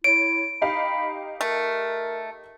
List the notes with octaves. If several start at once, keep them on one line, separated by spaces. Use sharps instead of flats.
E4 C#5 D7
D#4 G4 F5 B5
A3 A#4